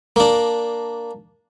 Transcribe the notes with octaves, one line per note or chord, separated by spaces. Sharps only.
A#3 D4